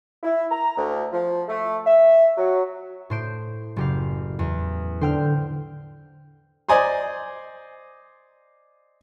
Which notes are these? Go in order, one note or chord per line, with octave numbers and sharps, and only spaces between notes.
E4
A#5
D2
F3
A3
E5
F#3
A2 C5 D7
F#1 G4 F5
E2
D3 C5 G5 F6
C5 D5 D#5 G#5 A#5 C6